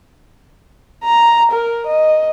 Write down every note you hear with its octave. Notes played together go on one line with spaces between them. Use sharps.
A#5
A#4
D#5